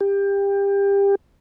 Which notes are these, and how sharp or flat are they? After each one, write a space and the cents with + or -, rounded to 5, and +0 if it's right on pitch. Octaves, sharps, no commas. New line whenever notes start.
G4 +25